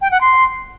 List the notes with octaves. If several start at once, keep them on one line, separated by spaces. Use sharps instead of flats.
G5
F#5
C6